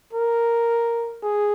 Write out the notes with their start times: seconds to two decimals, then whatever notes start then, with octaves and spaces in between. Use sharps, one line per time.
0.13 A#4
1.23 G#4